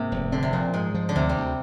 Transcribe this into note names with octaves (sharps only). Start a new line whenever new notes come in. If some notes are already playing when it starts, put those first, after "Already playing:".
Already playing: G#2 C3 A#3
F1
D3 C4
C3
A#2 F3
G#2 G#3
F3
D3
D2 C3
G3
D2